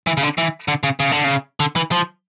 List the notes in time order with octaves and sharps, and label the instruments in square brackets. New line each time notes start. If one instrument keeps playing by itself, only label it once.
[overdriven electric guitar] E3
C#3
D3
E3
D3
C#3
C#3
D3
C#3
D3
E3
F3